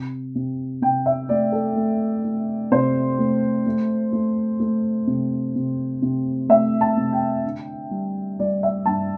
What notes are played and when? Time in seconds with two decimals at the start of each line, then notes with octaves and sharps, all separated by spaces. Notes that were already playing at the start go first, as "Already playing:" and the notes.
Already playing: C3
0.35 C3
0.82 C3 G5
1.06 E5
1.29 A3 D5
1.52 A4
1.76 A3
2.24 A3
2.71 C3 C5
3.19 A3
3.66 A3
4.13 A3
4.60 A3
5.07 C3
5.55 C3
6.02 C3
6.49 A3 E5
6.81 A5
6.97 C3
7.12 G5
7.44 D3
7.91 G3
8.39 G3 D5
8.63 E5
8.86 G2 A5